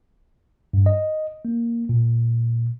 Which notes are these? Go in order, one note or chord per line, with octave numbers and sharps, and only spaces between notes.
G2
D#5
A#3
A#2